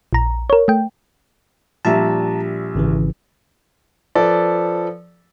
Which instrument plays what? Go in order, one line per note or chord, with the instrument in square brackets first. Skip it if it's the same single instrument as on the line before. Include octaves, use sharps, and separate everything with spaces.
[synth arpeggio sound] A#1 A#5
A#4 C#5
A3 G5
[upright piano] A#1 G3 E5 [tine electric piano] A5 A#5
[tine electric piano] G#1 C#3 E3
[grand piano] F3 A4 B4 D5